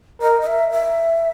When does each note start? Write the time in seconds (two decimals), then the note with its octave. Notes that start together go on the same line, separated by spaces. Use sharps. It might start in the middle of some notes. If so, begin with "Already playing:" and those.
0.21 A#4 D#5
0.42 D#5
0.47 E5
0.72 E5